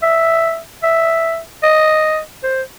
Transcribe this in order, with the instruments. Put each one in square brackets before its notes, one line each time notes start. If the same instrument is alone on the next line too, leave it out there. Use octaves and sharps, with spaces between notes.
[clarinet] E5
E5
D#5
C5